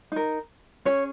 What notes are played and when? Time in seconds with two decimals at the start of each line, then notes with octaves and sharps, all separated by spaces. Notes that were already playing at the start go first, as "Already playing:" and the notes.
0.12 D#4 A#4
0.85 C#4 G#4 C#5